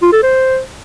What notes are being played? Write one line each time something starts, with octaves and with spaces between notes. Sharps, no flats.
F4
A4
C5